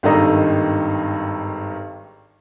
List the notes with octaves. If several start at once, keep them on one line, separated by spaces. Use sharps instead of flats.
G#1 G2 D#3 A4 D#5 A#5